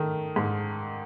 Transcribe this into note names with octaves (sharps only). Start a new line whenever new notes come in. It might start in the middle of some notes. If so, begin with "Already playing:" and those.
Already playing: D#3 A3
G#2